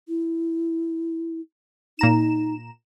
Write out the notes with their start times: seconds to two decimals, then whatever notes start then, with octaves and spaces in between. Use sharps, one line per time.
0.08 E4
1.99 A#2 D#4 A#5 E7